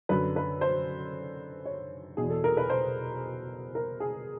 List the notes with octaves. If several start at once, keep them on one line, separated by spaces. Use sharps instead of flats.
F#2 D3 B4
B4
C5
C#5
E2 B2 G#4
A4
A#4
B4
C5
A#4
G#4